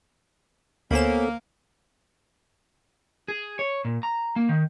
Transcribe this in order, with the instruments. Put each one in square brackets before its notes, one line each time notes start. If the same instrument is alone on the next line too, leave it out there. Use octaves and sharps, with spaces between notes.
[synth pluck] D2 E7 [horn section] A#3 [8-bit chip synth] B3 A4 [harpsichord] C#4 C5 B5
[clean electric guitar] G#4
C#5
A#2
A#5
A#3
D#3